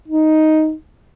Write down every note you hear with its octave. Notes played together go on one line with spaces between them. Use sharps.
D#4